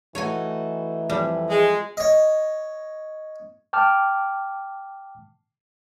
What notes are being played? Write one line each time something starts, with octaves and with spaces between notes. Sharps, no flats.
E3 A3 D#4 F#4 C#5 G#5
F2 G3
G#3
C#5 D#5
G5 A5 D6 F6